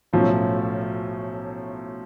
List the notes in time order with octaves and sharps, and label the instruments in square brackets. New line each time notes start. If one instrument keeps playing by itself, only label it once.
[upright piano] B1 A2 F#3 A3 C#4 [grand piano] F3